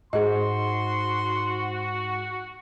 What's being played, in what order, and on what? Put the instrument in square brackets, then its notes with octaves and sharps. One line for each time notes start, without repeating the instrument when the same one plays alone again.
[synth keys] G#2 [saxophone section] F#4 [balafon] G#4 D#5 [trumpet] C6